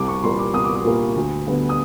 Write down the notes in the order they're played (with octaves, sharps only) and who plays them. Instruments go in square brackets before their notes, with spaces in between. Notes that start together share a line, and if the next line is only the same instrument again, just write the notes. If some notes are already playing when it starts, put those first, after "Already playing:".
Already playing: [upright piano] C2 D6
C#6
A#2 G3 A#3 C6
D6
C2 D#6
D6
D#6
A#2 G3 A#3
D2
D3 G3 B3
D#6